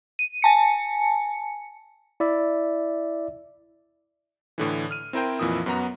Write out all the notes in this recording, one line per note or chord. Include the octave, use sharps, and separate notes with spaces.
D#7
G#5 A5 C#7
E4 D5 E5
A2 D3 E3
F6 D#7
C4 E4 A#4 C5 G5
F2 A#2 E3 E4 D#6
F#2 B3 F#4 A#5